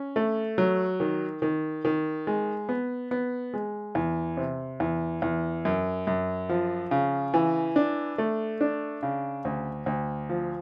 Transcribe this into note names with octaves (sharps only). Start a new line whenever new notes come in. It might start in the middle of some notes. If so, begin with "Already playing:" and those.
Already playing: C#4
A3
F#3
D#3
D#3
D#3
G#3
B3
B3
G#3
E2
C3
E2
E2
F#2
F#2
F3
C#3
E3
D4
A3
D4
C#3
D2
D2
F3